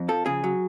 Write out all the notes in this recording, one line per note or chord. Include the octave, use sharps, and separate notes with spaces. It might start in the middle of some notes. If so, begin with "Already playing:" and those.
Already playing: F2
F3 A4
C#3 G#4
F#3